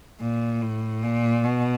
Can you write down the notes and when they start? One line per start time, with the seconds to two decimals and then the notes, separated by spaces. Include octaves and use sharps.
0.21 A#2
0.62 A2
1.03 A#2
1.44 B2